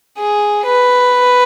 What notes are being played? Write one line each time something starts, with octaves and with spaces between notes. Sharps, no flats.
G#4
B4